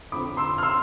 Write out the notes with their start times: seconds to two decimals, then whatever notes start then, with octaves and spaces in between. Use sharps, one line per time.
0.12 F2 D3 F3 C4 B5 D6
0.37 C6 E6
0.58 F6
0.63 C6 E6